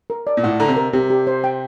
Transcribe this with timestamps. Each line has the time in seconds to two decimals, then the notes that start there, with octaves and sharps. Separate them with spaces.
0.10 A#4
0.27 D5
0.37 A#2
0.44 A2 F#5
0.60 D3 A#5
0.68 C3
0.77 A#4
0.93 C3 G4
1.10 G4
1.27 C5
1.44 G5